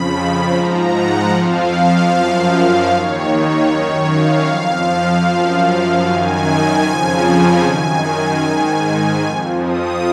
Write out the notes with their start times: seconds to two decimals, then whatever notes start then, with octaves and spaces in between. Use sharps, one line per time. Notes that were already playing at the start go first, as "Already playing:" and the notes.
Already playing: F2 C#3 F3 B5
0.52 G#2 F3 A#5
0.91 F#5
1.30 F2 F3 F5
2.10 F#2 F3
2.89 D#2 D#3 C#5
3.29 C#5
3.68 F#2 D#3 C#5
4.07 F5
4.46 F2 F3
5.26 F#2 F3
6.05 F#2 D#3 G#5
6.84 F2 C#3 F3
7.63 F#2 D#3 G#5
8.43 G#2 D#3
9.22 F2
9.27 F3
9.62 D#6